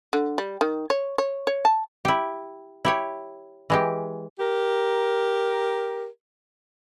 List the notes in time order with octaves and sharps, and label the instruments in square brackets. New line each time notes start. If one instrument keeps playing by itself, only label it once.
[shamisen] D3
G3
D#3
C#5
C#5
C#5
A5
[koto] E4 G4
E4 G4 C#5
E3 G#3 G4
[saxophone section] G4 A#4